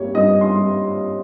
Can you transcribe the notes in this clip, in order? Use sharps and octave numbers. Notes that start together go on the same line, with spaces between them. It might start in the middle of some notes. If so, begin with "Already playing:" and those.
Already playing: G2 G3 A#3 C#5
G2 D#5
C6
G3